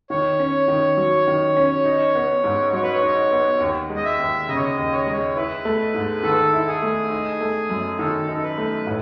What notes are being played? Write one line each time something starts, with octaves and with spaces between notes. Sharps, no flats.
D#3 C#5
C#4
D#3
F#3
D#3
C#4
D#4
B3
G#2
F#3 C#5
B4
C#5
D#4
B3
D#2
G#3
D#5
E5
D#2
C#3 D#5
C#5
D#5
D#2
C#5
G#3 D#5
C#5
E4 B4
A3
G#2
D#3 A4
E4
G#4
A3
D#4
A3
F#2
D#3 A4
D#4
A4
B4
A3
A2